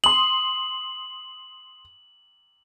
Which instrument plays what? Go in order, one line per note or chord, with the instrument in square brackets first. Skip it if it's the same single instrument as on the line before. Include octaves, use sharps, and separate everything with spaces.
[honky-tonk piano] C6 D#6 [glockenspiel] F#7